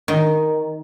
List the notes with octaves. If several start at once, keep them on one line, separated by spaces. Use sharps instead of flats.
D#3